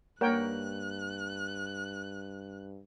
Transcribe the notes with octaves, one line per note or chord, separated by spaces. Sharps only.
G2 A#3 A#4 C#5 G5 F#6